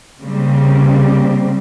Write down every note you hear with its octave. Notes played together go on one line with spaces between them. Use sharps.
C#3 G3 A#3 C4